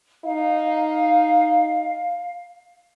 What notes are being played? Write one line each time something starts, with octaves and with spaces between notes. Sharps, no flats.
D#4 F5